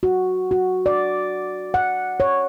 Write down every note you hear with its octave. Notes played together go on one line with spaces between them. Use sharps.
F#4
F#4
D5
F#5
C#5